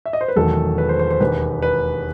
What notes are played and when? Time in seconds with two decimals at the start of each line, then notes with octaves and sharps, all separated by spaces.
0.06 E5
0.13 D#5
0.21 C5
0.28 B4
0.36 E1 E2 D#3 F#3 A3 A4
0.78 B4
0.89 C5
0.99 C5
1.10 C5
1.20 E1 D#2 D#3 B4
1.62 B4